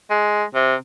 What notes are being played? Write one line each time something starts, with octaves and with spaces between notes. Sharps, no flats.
G#3
C3